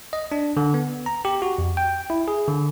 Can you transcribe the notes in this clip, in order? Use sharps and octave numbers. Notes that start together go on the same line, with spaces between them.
D#5
D4
D3
B3
A#5
G4
F#4
F2
G5
E4
G#4
D3